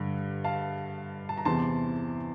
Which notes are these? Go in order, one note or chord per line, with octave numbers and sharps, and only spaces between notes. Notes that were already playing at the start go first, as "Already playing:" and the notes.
Already playing: G2 D3
F5 A5
A5
A#5
E2 C3 E3 A5 C6